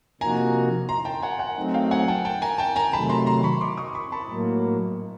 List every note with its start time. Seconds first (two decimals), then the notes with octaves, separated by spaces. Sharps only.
0.21 C3 F3 A#3 D#4 F#4 G#5 A#5
0.89 A#5 C6
1.05 G5 A5
1.23 F#5 G#5
1.39 F#5 G#5
1.56 F#3 A3 C4 D#4
1.74 F5 G5
1.91 F#5 G#5
2.08 G5 A5
2.25 G5 A5
2.42 G#5 A#5
2.58 G5 A5
2.76 G#5 A#5
2.93 C3 D#3 F#3 A3 A5 B5
3.10 A#5 C6
3.26 A#5 C6
3.43 B5 C#6
3.61 C6 D6
3.77 C#6 D#6
3.95 B5 C#6
4.12 A5 B5
4.29 A2 F#3 A#3